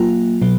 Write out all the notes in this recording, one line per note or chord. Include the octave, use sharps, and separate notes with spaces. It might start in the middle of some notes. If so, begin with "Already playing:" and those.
Already playing: F#3 A#3 F4
B2 F#3